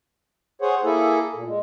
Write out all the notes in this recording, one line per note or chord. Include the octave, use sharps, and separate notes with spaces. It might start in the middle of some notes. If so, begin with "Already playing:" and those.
G#4 C5 C#5 F#5
A#3 E4 G#4 A4
A#2
G#3